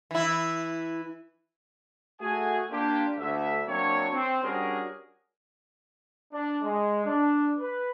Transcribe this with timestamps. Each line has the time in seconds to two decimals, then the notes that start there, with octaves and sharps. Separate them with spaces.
0.11 E3 E4
2.21 A3 F#4 G#4 G#5
2.71 A#3 D4 F4 G4
3.18 D2 E5
3.68 F#3 A#3 C4 D4 E4 C#5
4.13 C4
4.44 G3 C#4 D4 F#4 G#4 A#4
6.32 D4
6.63 G#3
7.05 D4
7.59 B4